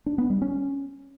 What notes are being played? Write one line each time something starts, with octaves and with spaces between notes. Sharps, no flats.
D4
B3
G3
C#4